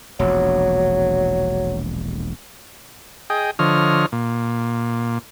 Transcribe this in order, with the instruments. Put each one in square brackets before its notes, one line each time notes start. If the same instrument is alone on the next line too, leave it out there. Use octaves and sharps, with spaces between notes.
[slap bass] E1 A#1 [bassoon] F#3
[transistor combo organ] G#4 D#5 G5
D3 F3 C#5 D#5 F6
A#2